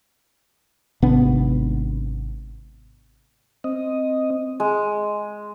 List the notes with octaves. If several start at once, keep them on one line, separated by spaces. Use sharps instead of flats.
G#1 C3 B3 D4
C4 D#5
G#3